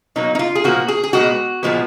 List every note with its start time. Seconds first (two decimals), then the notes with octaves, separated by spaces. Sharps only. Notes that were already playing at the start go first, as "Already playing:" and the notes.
0.16 B2 F#3 A#3 D#4
0.35 D#4
0.39 F4
0.55 G#4
0.64 A#2 F3 A#3 F#4
0.88 G#4
1.04 G#4
1.13 A#2 G#3 B3 F#4
1.63 A#2 F3 G#3 B3